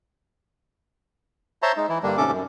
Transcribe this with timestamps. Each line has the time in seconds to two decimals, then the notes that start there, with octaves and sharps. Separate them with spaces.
1.62 C5 C#5 E5 A5 A#5 C6
1.77 G#3 D#4
1.89 E3 E4
2.03 G2 D3 G3 A#3 D4
2.17 D#2 G#2 C3 C#4 A4 D6
2.31 F#2